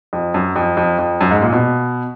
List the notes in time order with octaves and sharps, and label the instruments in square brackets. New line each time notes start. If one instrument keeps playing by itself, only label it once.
[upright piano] F2
F#2
F2
F2
F2
F#2
G#2
A#2
B2